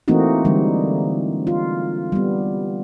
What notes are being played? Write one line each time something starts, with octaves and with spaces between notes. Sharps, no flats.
E3 A3 A#3 C4 D#4 F#4
D3 E3 G3 G#3
F4
G3 B3